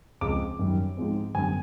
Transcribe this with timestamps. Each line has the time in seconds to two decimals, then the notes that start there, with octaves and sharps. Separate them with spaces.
0.21 C#2 C#3 F3 G#3 C4 D6
0.59 F#2 D#3 G3
0.96 G#2 F3 G#3 C4
1.34 F#2 D3 G3 B3 G#5